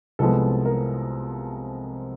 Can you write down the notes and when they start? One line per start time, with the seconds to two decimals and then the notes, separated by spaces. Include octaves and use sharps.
0.19 C2 C3 F3 G#3 B3 A4
0.65 A#4